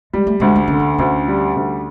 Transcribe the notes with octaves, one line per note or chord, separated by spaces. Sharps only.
G3 G#3
A3
D2 G#3
D4
D3 C#4
D4
D2 C#4
G3
D2